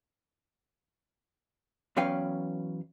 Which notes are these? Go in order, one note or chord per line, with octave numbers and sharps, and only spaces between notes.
E2 F#3 C#4 B4 F5 G5